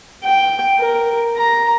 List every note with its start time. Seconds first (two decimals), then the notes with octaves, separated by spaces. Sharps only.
0.24 G5
0.79 A#4
1.37 A#5